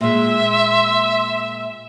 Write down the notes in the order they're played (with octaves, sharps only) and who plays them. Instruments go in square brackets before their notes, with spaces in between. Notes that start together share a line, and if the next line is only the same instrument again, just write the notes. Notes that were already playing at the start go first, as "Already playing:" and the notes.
[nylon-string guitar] A#2 G#3 [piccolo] E5 [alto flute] C6